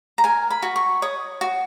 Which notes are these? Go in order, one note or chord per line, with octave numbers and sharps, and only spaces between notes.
A#5
A#4 G#5
B5
F#4
C#6
C#5 D#6
F#4